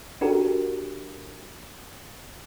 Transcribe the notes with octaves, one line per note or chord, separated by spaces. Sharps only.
D4 F#4 G4 A4 A#4